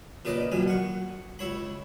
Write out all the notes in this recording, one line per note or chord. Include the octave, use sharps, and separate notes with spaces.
A#2 C#3 B4 D5 D#5
B1 F#2 A#2 D#3 G#5
F#5 C#6
C#2 E4 C#5 B5